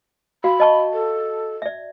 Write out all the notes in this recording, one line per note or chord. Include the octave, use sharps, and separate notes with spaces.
F#4 F5 B5
D#5 A5 C#6
A4
D5 E5